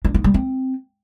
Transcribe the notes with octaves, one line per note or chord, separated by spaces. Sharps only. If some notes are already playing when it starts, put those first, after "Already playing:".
D4
D#4
G3
C4